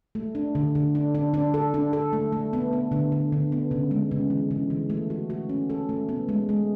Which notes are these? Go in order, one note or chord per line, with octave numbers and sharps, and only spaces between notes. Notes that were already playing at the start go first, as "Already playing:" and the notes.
A3
D4
D3
D3
D4
D4
D4
A4
D4
A4
A3
A3
B3
B3
D3
D3
D3
B3
C#3
G#3
C#3
E3
C#3
E3
A3
F#4
F#4
C#4
A4
A3
B3
G#3
G#3